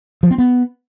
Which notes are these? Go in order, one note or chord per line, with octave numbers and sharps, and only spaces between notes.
F3
C4
B3